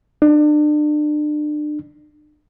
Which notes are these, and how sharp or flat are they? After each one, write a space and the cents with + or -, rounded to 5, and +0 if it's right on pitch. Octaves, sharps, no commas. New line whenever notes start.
D4 +35